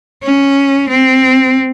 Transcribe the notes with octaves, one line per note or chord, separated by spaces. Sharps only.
C#4
C4